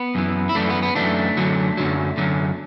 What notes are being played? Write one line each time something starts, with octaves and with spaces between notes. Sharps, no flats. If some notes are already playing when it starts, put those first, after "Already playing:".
Already playing: B3
F#2 E3
E4
F#2 E3 A3 D4
B3
B3
F#2 E3 A3 D4
F#2 D3 F#3
F#2 D3 F#3
F#2 D3 F#3